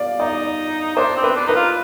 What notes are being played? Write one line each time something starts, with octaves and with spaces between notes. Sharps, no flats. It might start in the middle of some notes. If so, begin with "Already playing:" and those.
Already playing: D5 F5
D#4 D5
D4 C5
C4
B4
D4
D#4 B4
F4